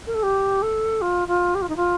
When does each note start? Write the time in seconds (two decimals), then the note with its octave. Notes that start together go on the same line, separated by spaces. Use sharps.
0.06 A#4
0.14 A4
0.23 G4
0.62 A4
1.01 F4
1.27 F4
1.54 G4
1.61 F4
1.68 D#4
1.76 F4